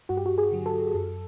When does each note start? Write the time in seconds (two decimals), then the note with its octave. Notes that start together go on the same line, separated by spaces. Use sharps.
0.09 G2 F#4
0.17 G4
0.26 F#4
0.38 G#4
0.51 D3 F#3
0.66 A4
0.94 F#2